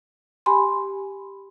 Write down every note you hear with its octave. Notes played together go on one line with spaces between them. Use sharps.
G4 G#5 B5 C6